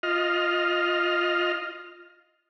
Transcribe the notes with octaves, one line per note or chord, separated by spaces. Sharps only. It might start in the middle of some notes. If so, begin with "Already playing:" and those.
F4 D#5 F6